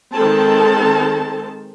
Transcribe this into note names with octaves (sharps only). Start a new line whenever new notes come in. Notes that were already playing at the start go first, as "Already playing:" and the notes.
D#3 G#3 C4 A4 A5